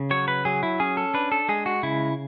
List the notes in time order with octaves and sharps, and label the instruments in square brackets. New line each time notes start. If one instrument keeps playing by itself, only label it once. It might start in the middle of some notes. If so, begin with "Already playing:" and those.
Already playing: [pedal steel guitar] C#3
F#3 C#5
B4
F#3 G#4
E4
C#4 G#4
A4
D4 B4
A4
G#3 G#4
F#4
C#3 E4